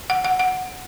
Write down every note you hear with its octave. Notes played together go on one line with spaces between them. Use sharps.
F#5
F#5
F#5